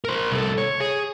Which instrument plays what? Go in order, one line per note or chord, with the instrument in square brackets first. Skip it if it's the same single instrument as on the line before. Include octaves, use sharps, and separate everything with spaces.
[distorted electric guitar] A#4 C5
C2 A4
C#5
G#4